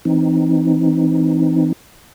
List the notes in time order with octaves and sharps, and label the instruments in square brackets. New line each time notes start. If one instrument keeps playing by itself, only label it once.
[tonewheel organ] E3 C4 D#4